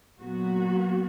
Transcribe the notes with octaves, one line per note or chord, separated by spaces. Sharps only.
A#2 F#3 B3 F#4